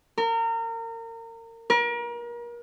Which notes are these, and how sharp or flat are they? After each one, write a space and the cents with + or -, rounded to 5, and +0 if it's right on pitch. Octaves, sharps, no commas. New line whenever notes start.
A#4 -30
A#4 +35